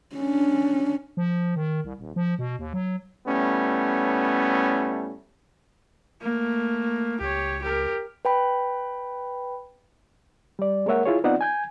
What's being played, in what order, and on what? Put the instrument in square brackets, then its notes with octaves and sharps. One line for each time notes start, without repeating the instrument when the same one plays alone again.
[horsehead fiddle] C#4 D4
[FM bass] F3
D#3
C2
D#1
F3
B2
D#2
F#3
[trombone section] A2 G3 A3 B3 C#4
[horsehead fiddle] A3 A#3
[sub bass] C#2 [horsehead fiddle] G4 C#5
[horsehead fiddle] G4 A#4
[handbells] B4 G5 B5
[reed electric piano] G3 D5
G#3 A#3 A#4 C#5 E5 F#5
E4 F4 G#4 C#5
B3 C4 D#4 F4 D5 F#5
G#5 G6 G#6